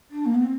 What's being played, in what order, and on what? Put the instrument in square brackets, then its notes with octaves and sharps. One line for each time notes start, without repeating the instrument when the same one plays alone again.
[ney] D4
A#3
B3
C4